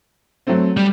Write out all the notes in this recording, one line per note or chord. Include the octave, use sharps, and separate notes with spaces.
F#3 A3 C4
G3